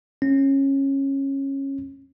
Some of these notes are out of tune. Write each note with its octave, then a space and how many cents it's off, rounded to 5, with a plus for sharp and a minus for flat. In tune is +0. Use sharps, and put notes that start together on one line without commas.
C#4 -20